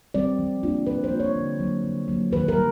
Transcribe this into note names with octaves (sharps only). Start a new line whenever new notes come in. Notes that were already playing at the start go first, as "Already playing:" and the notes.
G3 C4 D5
F3
A#3 D4 F4
F3 B4
C5
A#3 D4 F4
C#5
D3
F#3 A#3
D3
F#3 A#3
D#3 B4
A#4
G3